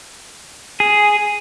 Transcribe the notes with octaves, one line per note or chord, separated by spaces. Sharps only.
G#4